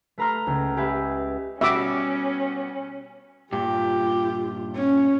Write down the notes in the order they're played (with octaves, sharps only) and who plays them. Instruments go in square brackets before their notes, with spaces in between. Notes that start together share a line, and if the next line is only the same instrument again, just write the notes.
[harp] A3 B4 A#5 C6 F6
C#2
G4 G#4 B4 E5
[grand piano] B2 G3 F#4 [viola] C#4 [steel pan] E5 D6
[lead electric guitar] G2 A#2 [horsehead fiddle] F4 [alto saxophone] G4
[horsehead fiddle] C#4